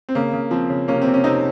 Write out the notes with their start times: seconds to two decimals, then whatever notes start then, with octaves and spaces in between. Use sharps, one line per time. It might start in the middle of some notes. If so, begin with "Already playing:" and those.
0.09 C4
0.15 C#3 A#3
0.33 C#3
0.51 F3 C4
0.70 C#3
0.88 C3 A#3 C#4
1.02 C4
1.07 C3
1.14 C#4
1.24 C3 C4 D#4